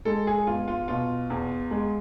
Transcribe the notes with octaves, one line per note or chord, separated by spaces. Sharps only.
G#3 A4
G#4
E2 F4
F4
B2 F4
E2
G#3